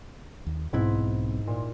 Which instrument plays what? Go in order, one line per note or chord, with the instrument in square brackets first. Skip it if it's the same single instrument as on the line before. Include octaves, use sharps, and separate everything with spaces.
[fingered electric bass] D#2
[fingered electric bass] B1 B2 C4 [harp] G#2 E4 G#6
[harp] A#2